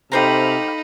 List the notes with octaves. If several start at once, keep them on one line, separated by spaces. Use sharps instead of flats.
C3 D#4 G4 A4 C5 F5 A#5 B5